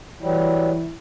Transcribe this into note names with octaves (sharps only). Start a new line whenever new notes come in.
E3 F#3 G3 E4